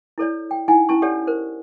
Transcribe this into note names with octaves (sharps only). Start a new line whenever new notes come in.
E4 A4 C#5 D5
G5
D#4 E4 F#5 G#5
C#4 E4 A5 C#6
G4 A4 C#5 D5 F#5
A#4 C5